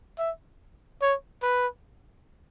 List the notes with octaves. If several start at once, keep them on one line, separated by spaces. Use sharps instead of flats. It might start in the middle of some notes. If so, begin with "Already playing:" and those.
E5
C#5
B4